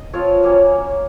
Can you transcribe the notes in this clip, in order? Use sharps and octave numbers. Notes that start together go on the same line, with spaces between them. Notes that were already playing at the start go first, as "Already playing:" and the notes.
Already playing: D#5
F3 C4 F4 C#5 F5
F#3 A#3 C#4